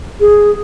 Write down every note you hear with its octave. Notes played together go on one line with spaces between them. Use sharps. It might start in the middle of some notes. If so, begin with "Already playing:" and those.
G#4